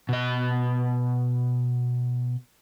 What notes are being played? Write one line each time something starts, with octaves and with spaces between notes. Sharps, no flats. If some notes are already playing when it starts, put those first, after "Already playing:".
B2 D#5